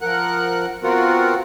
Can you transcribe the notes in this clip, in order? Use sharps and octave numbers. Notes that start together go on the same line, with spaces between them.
F3 A#4 F#5 F#6
B3 C4 F4 F#4 A#4 F#5